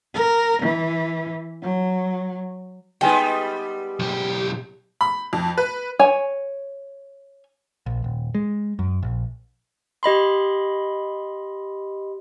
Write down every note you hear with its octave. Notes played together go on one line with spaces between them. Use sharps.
A#4
E3
F#3
G3 G#3 B3 D#4 B4 G5 G#5
B1 G4
B5
F2
B4
C#5 G#5
A#1
D#1
G#3
F#2
A#1
G4 D#5 B5 C6